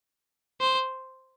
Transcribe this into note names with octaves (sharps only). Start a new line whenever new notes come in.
C5